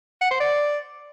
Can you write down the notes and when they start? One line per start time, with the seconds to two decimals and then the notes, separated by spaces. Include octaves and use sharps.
0.21 F#5
0.31 C5
0.40 D5